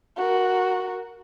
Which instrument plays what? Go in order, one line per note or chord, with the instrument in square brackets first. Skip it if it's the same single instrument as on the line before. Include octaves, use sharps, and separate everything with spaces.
[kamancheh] F#4 A#4